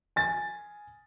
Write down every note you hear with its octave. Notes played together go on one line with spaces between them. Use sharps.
G#5 A6